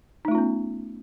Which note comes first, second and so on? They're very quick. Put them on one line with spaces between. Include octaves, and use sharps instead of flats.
D#4 A3 F4 C#4 B3